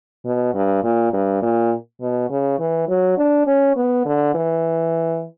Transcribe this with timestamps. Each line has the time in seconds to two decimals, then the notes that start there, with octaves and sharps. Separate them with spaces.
0.25 B2
0.54 G2
0.83 A#2
1.13 G2
1.42 A#2
2.01 B2
2.30 C#3
2.59 E3
2.88 F#3
3.17 D4
3.47 C#4
3.76 B3
4.05 D3
4.34 E3